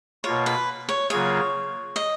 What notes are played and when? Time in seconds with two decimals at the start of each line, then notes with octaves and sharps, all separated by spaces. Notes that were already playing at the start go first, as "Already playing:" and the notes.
0.24 B2 A#3 F4 C#5
0.46 B4
0.89 C#5
1.10 C#3 F#3 A#3 F4 G#4 C#5
1.96 D#5